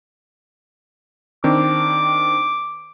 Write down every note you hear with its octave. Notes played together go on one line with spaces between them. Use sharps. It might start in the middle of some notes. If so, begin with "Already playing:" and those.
D#3 C4 D4 D6